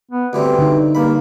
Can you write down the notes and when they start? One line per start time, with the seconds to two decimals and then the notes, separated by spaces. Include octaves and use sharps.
0.11 B3
0.33 D2 E3 G3 C4
0.58 D3 D#4
0.95 G2 A#3 B5